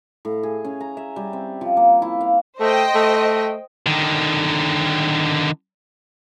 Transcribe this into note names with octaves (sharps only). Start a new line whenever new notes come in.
A2
G#4
C#4
A#5
E5
G3
C4
F3
A#3
E4
F5
A3 C5 D#5 G5
A3
D3 D#3